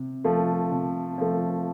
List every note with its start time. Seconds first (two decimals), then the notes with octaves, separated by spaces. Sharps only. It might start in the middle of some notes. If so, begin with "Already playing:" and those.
Already playing: C3
0.24 F3 A3
0.72 C3
1.18 F3 A3